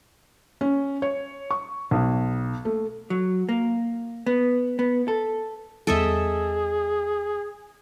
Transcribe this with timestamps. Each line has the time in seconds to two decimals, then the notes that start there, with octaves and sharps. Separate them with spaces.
0.61 C#4
1.02 C#5
1.51 C#6
1.91 B1
2.65 A3
3.10 F#3
3.49 A#3
4.27 B3
4.79 B3
5.08 A4
5.87 E2 G3 G#4 A4 D#5 E5